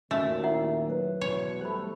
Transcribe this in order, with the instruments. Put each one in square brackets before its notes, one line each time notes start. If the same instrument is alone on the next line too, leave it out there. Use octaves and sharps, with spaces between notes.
[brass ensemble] D#2 A#2 [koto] A3 [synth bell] C#4 F#4 E6
[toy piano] E4 E5 F#5
[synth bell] F#3 B4
[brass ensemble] E2 B2 [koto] C#5
[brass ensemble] G3 A3 [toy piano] C5 B5